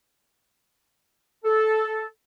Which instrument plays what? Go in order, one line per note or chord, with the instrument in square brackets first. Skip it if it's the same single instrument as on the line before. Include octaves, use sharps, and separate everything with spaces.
[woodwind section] A4